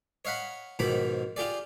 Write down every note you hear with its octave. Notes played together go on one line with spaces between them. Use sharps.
C#5 D#5 F5 F#5 B5
G#2 B2 D#3 F3 B5 D6
F4 G4 G#4 D5